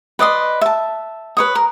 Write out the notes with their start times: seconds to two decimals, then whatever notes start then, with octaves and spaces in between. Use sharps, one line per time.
0.19 B4 D5 D#5 C6
0.61 E5 A5
1.37 B4 C#5 D#6
1.55 A#4